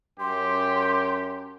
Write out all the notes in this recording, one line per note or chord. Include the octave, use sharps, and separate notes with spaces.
F#2 G4 C6